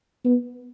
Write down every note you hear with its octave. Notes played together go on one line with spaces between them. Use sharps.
B3